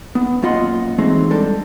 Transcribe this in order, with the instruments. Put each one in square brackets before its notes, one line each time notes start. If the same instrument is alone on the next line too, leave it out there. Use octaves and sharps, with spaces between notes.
[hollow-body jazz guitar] B3
F#2 A#2 F4 D#5 F#5 C6
E3 F#3 G#3 A3 C4 D#4
G3 D4 A4